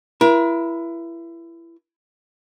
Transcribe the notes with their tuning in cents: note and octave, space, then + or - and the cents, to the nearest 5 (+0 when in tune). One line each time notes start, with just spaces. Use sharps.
E4 +25 A#4 +45